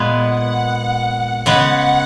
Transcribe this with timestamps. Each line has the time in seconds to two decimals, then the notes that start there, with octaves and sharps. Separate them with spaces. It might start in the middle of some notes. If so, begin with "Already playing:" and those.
Already playing: A#2 G#3 B3
0.22 F#5
1.46 C#3 G#3 B3 F#5